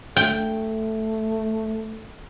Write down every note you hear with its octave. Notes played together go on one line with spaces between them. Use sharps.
A3 G5